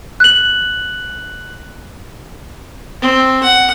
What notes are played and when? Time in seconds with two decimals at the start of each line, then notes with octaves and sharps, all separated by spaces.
0.20 F#6 F#7
3.01 C4
3.43 F#5